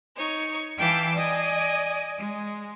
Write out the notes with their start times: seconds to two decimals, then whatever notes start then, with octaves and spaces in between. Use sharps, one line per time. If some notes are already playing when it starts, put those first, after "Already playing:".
0.17 D#4 C#5 C#6
0.78 E3 F5 G5 A5 D6 E6
1.14 D5 D#5 G#5
2.18 G#3